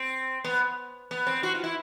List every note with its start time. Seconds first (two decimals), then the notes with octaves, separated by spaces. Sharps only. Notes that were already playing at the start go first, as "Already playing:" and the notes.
Already playing: C4
0.44 B3
1.11 B3
1.27 C4
1.43 F#4
1.55 F4
1.64 E4